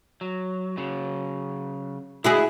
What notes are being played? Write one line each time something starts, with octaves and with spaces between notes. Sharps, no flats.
F#3
C#3 F#3
D3 G#3 E4 F#4 G#4